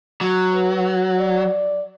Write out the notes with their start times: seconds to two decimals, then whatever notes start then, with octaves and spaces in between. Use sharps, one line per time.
0.21 F#3
0.53 B4
1.19 D5